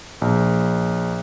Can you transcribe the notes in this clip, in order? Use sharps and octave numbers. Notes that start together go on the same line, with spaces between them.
A#1